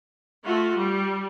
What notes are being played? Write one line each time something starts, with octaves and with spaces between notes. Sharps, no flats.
A3 F4 F#4
G3